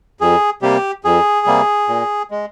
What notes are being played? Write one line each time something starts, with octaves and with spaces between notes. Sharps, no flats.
F2 G#4
C3 G3 A#3 G4
F2 G#4
C3 G3 A#3
A#2
G#3